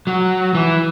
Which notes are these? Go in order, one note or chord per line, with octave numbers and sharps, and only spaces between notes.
F#3
E3